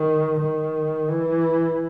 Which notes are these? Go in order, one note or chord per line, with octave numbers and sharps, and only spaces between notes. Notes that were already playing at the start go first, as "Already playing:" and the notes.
Already playing: D#3
D#3
E3